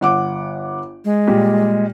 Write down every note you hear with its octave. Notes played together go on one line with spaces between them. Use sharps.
G1 F#5 D6
G#3
A#2 G3 G4